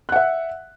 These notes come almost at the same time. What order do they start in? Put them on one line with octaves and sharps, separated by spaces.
F#6 F#5 E5